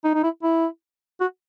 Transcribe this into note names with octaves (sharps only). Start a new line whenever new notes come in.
D#4
D#4
E4
E4
F#4